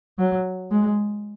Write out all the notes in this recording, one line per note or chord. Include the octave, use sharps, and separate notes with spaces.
F#3
G#3